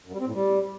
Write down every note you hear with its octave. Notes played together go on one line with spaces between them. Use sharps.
F#2
G3
C4
A2
G3